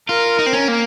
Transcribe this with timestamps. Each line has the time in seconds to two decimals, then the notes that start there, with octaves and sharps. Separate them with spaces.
0.09 F4 A#4
0.39 D#4
0.46 C4
0.53 C#4
0.68 A#3